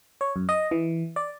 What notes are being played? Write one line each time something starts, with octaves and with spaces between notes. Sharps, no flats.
C#5
F#2
D#5
E3
D5